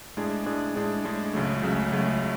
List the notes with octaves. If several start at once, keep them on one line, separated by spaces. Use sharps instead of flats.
A2 G#3 D4 G#4
A2 G#3 D4 G#4
A2 G#3 D4 G#4
A2 G#3 D4 G#4
C#2 C#3 F#3 A3
C#2 C#3 F#3 A3
C#2 C#3 F#3 A3